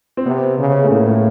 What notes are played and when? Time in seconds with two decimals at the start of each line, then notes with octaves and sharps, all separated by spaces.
0.17 C4
0.26 C3 B3
0.59 C#3
0.84 A3
0.90 A2 A#3
1.07 A3